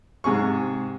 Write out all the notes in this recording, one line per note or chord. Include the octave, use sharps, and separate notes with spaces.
G#2 C3 G#4 C#6